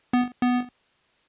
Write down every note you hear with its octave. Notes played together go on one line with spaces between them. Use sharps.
B3
B3